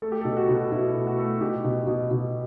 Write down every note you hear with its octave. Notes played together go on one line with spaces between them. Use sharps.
A3 A4
G4
B2 A4
F#4
B2
B2 E4
A3
F#4
A3
B2 G4
B2
B2
B2